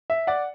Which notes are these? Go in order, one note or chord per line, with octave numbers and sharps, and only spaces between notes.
E5
D5 F#5